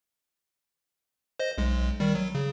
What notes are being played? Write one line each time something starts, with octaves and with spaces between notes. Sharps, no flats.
C5 D#5
B1 G#3
D#3 G3
F#3
C#3